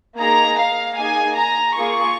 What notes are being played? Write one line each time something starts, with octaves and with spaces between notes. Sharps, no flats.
A#3 D#4 G#4 A#5
F5
A#3 D#4 G#4 G#5
A#5
A#3 F4 G#4 C#6